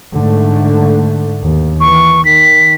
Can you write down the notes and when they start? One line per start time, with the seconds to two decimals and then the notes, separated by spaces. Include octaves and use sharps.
0.14 G#2 D3 A3
1.43 D#2
1.80 E3 C#6
2.25 D#3 B6